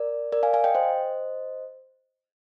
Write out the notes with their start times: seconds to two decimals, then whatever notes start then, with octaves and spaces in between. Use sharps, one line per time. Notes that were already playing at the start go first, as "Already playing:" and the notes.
Already playing: A#4 D5
0.32 A#4 D5
0.43 F5 G#5
0.53 F5 G#5
0.64 D#5 G5
0.75 C5 D#5